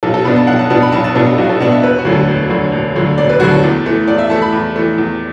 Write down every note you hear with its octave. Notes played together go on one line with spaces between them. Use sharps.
B1 A4
A4
B2 B3 D4 B5
A5
B1 F#5
A5
B2 B3 D4 A5
B5
B1 A5
A5
B2 B3 D4 A4
A4
B1 F#4
A4
B2 B3 D4 A5
E5
E1 B4
F#4
D2 D3 F#3
A4
E1
D2 D3 F#3
E1
D2 D3 F#3
E1 D5
B4
D2 D3 F#3 F#4
A4
E2
E3 A3
E2 D5
E5
E3 A3 A5
B5
E2
E3 A3
E2